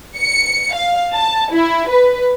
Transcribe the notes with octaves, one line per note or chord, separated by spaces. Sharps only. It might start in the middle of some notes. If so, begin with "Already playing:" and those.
C#7
F5
A5
E4
B4